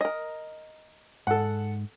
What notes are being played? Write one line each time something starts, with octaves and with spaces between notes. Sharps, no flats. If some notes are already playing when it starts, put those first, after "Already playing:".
A#4 D#5
G#2 A4 F#5